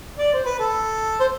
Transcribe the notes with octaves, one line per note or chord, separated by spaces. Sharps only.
D5
C5
B4
A4
C5